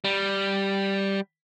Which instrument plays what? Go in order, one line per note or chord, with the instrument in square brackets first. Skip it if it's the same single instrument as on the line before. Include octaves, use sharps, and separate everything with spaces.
[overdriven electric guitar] G3